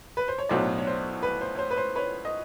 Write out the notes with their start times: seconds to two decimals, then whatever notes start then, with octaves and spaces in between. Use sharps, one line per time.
0.17 B4
0.28 C5
0.38 C#5
0.49 B1 A2 F#3 B3 D4 C5 D5
0.78 C#5
0.87 C5
1.23 B4
1.41 C5
1.55 C#5
1.59 C5
1.71 B4
1.77 C5
1.96 B4 C#5
2.25 D#5